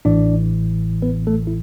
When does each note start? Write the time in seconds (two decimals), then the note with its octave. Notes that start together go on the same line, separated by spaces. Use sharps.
0.05 A1 A2 E3 D4 D5
1.02 B3 B4
1.27 A3 A4
1.47 E4